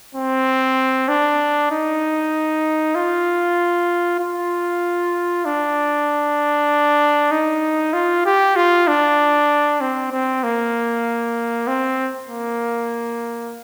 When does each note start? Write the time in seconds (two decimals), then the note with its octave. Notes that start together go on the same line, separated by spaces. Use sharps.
0.15 C4
1.08 D4
1.71 D#4
2.95 F4
4.20 F4
5.45 D4
7.31 D#4
7.93 F4
8.26 G4
8.56 F4
8.88 D4
9.81 C4
10.12 C4
10.44 A#3
11.67 C4
12.29 A#3